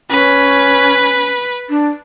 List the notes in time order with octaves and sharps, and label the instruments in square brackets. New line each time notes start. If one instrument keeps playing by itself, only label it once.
[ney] C#4 [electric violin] B4
[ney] D4